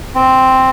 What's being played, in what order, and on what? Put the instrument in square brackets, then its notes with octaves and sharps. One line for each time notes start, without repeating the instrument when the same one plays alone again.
[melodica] C4